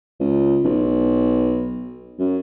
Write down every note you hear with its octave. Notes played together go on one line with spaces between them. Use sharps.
C#2
B1
F#2